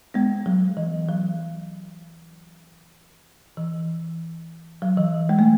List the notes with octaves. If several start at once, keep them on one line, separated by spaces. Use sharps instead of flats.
G#3 B3
F#3
E3
F#3
E3
F#3
E3
G#3
A3